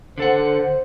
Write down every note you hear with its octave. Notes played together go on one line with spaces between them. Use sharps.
D3 A4 C5 F#5